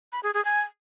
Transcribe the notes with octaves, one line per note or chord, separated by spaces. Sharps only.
B5
G#4
G#4
G#5